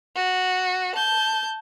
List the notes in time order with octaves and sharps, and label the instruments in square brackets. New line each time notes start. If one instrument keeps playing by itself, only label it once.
[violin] F#4
A5 G6